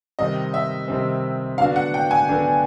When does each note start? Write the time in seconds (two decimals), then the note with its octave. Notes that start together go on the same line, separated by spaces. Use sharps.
0.19 C3 D#3 G3 C4 D#5
0.54 E5
0.88 C3 D#3 G3 C4
1.58 D3 F#3 B3 D4 F#4 F5
1.76 F#5
1.94 G5
2.11 G#5
2.29 D3 F#3 B3 D4 F#4